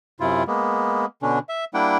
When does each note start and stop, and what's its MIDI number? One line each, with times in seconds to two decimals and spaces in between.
0.20 0.43 42
0.20 0.43 48
0.20 0.43 64
0.20 0.43 65
0.48 1.05 56
0.48 1.05 58
0.48 1.05 59
1.23 1.39 47
1.23 1.39 50
1.23 1.39 61
1.23 1.39 62
1.49 1.65 76
1.74 1.98 55
1.74 1.98 58
1.74 1.98 62
1.74 1.98 64
1.74 1.98 78
1.74 1.98 79